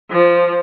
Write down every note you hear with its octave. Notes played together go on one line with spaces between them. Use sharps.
F3